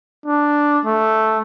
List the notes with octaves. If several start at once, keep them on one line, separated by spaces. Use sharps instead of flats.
D4
A3